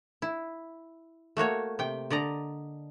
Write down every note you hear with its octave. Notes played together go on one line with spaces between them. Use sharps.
E4
A3 A#3 F#4 C#5
C3 G5
D3 D5 D#5 A#5